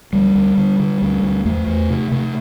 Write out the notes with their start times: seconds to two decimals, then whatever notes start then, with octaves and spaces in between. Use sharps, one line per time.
0.13 D2 G3
0.35 D2
0.57 D3
0.79 D3
1.02 D2
1.23 D2
1.45 E2 A3
1.67 E2
1.90 C3
2.12 C3